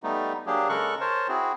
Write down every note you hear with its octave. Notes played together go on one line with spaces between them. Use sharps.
G3 A3 B3 D#4
F#3 A#3 D4 G4 G#4
C#3 G#3 A4 A#4 C#6 F#6
A#4 C5 C#5 A5
C4 E4 F#4 G#4